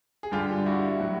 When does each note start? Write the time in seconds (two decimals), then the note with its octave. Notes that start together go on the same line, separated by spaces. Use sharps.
0.23 G#4
0.32 G2 D3 G3 F4 G4
0.66 E4 F#4
1.00 A2 F#3